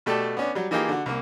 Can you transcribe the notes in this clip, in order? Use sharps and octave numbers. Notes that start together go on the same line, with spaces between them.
B2 A3 G4 A4 D5 A5
B3 C#4 D4
F#3 G3
E3 A#3 D#4 F4 G4 G#4
D3 F#4
C2 A#3